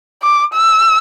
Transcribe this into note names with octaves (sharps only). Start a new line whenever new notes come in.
D6
E6